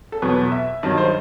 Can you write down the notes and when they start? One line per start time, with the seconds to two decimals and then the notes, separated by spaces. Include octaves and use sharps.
0.12 A4
0.22 E2 B2 F#3 B4
0.52 E5
0.83 G2 D#3 F#3 D#5
0.97 C5